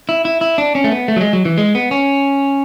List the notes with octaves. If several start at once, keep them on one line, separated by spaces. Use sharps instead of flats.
E4
E4
E4
D4
C#4
A3
B3
A3
F#3
G#3
F#3
E3
G#3
B3
C#4